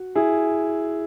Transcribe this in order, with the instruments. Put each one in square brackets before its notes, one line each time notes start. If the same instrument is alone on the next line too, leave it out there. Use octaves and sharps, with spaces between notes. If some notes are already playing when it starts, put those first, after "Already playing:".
Already playing: [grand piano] F#4
E4 G#4